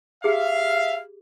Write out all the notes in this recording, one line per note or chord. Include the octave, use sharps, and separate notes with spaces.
G4 G#4 E5 F5